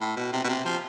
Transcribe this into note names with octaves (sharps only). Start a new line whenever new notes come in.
A2
B2
C3
B2
C3
F3